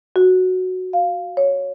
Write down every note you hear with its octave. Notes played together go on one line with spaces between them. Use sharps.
F#4
F5
C#5